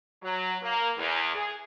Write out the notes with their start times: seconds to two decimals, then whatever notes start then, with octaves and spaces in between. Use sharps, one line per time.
0.22 F#3
0.62 A#3
0.96 E2
1.34 G#4